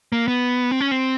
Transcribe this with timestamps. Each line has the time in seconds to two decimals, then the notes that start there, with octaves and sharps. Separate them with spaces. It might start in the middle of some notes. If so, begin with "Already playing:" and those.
0.12 A#3
0.28 B3
0.71 C4
0.81 C#4
0.91 C4